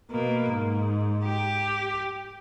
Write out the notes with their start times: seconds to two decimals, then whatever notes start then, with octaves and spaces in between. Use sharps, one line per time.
0.11 B2 A#3
0.51 G#2
1.25 G4